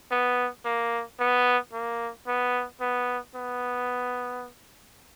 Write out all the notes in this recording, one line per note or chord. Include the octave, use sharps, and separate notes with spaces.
B3
A#3
B3
A#3
B3
B3
B3